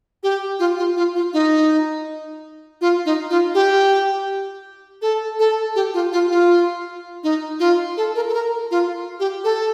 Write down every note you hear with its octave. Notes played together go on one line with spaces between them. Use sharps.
G4
F4
F4
F4
F4
D#4
F4
D#4
F4
G4
A4
A4
G4
F4
F4
F4
D#4
F4
A4
A#4
A4
A#4
F4
G4
A4